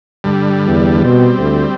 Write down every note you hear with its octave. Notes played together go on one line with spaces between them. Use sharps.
G2 D3 G3
E2
B2 G3 C4
D2